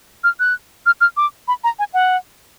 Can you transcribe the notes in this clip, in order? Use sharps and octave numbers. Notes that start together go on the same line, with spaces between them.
F6
F#6
F6
F6
D6
B5
A#5
G#5
F#5